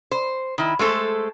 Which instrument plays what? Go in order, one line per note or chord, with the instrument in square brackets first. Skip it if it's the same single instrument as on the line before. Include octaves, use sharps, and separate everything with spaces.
[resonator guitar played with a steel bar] C5
D#3 E4
G#3 A3 A4 C5